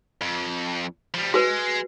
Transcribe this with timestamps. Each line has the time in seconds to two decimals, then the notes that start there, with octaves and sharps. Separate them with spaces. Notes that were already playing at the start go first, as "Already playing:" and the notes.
0.21 F2
1.14 F3 G3
1.34 G#3 F#4 B4